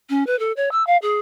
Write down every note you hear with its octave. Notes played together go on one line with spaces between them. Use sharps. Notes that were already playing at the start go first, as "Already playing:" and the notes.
C#4
B4
A4
C#5
E6
F5
G#4